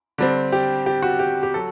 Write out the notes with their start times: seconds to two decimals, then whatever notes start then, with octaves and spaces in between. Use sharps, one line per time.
0.18 D3 G3 C4
0.52 G4
0.86 G4
1.02 F#4
1.19 G4
1.43 G4
1.54 F#3 A4